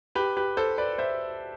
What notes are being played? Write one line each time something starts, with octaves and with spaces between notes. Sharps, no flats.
G4 B4
G4 B4
A4 C5
B4 D5
C5 E5